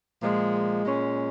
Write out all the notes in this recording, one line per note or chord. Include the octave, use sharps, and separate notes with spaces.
A#2 F3 G#3
A#2 G#3 C#4